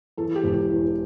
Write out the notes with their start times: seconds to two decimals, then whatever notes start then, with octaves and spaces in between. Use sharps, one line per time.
0.17 E2 A4
0.35 G4
0.44 E1
0.53 G4
0.70 E2